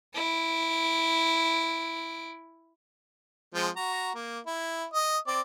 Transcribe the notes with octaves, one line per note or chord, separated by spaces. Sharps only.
E4 D7
F3 G#3 C4
F#4 A#5
A#3
E4
D#5
C4 D5